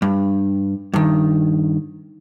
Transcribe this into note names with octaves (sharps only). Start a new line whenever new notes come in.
G2
G2 D#3